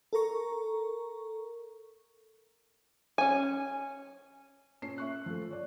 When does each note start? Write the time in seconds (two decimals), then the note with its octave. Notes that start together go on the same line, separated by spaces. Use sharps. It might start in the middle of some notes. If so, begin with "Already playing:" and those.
0.13 A4 A#4 A#5 C#6
3.18 C#4 G#5
4.82 A#2 C#4 C7
4.98 E5 C#6 F#6
5.26 F3 A3
5.51 C#5 D5